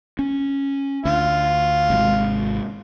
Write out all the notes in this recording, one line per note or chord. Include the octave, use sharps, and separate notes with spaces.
C#4
D2 F4
G#1 C3 G#3